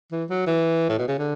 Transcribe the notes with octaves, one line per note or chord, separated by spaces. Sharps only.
E3
F#3
E3
A2
B2
C#3
D3